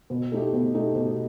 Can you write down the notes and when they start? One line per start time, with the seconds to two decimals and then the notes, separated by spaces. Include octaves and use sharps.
0.10 B2
0.32 A3 D#4 G4
0.53 B2
0.75 A3 D#4 G4
0.95 B2